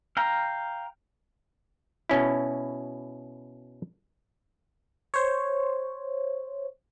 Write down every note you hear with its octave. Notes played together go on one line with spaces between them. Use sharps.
F5 G5 A#5
B2 C#4 E4
C5 C#5